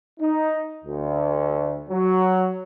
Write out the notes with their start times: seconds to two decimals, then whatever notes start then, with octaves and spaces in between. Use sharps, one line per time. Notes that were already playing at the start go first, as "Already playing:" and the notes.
0.19 D#4
0.84 D2
1.89 F#3